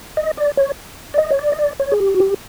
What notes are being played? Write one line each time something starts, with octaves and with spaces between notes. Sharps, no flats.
D#5
D5
C#5
D5
D#5
C#5
D5
D#5
D5
C#5
G#4
G4
F#4
G4